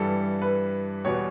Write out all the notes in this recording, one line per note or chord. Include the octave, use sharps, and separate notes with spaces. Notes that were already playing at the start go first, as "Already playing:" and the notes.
Already playing: G2 E3 G3 A4
B4
E2 B2 G3 C#5